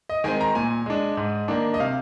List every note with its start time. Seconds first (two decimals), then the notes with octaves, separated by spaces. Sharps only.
0.09 D#5
0.24 D#3 G#3 C4 G#5
0.41 A#5
0.55 A#2 G#5
0.86 G#3 D4
1.17 G#2
1.48 D#3 A#3 D4
1.74 D#5
1.80 C3 F5